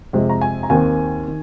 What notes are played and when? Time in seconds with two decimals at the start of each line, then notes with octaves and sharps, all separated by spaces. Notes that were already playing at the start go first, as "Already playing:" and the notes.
0.13 F2 C3 G#3
0.29 A#5
0.41 G#5
0.63 A#5
0.70 D#2 D#3 C4 G#5
1.28 D#3